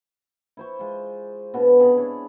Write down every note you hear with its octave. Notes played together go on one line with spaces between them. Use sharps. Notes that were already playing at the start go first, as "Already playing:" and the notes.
E4 C5 C#6
G#3 F4
B2 B3 D4
C3 G#4
D4 E4 C#5